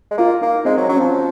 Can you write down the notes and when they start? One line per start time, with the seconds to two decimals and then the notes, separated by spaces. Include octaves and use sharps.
0.11 G#3
0.18 A#3 F4
0.41 A#3 D#4
0.65 G#3 C4
0.77 F#3
0.89 F#3 C#4
0.96 C4
1.00 F3 C#4